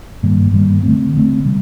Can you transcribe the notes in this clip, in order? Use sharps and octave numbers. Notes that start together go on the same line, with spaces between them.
G2 D#3 G3 A#3
G2 D#3 G3 A#3
D3 A3 C4
D3 A3 C4
C3 G3